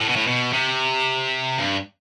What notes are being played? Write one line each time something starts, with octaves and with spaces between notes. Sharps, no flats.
A2
B2
A2
B2
C3
G2